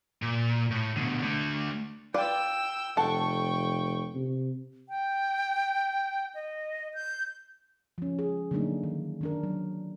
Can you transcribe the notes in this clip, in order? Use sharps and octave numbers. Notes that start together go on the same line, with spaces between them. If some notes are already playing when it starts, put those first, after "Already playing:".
A#2
A2
B2 D3
D3 A3
F4 B4 D5 G5 E6
F1 A4 F#5 G5 C#6
C3
G5
D#5
G6
F3 C#4
G#4
D3 F#3 A3 A#3 D4 D#4
D#3
D#3 D4 A#4
F#3